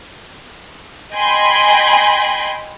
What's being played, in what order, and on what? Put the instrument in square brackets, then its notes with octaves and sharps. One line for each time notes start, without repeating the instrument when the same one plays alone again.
[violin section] D#5 G5 G#5 B5 C6